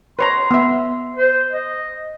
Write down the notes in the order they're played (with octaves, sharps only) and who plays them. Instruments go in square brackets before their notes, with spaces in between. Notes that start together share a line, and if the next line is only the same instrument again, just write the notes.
[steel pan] B4 C#5 A#5 [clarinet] C6
[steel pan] B3 E5
[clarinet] C5
D#5